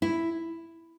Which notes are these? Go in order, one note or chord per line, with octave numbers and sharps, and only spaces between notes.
E4